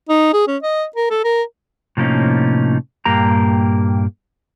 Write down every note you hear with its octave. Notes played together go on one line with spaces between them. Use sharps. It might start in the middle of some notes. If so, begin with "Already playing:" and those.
D#4
G#4
C#4
D#5
A#4
A4
A#4
A2 C3 F3 A#3 C#4 D#4
G2 A#2 A#3 G4 A#5